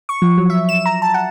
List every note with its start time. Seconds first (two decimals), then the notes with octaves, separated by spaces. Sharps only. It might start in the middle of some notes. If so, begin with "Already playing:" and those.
0.09 C#6
0.22 F3
0.38 F#3
0.50 E5
0.69 E7
0.86 A#5
1.02 A5
1.14 F#5